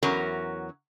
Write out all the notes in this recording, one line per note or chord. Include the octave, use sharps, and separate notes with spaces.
E2 F#3 C#4 A#4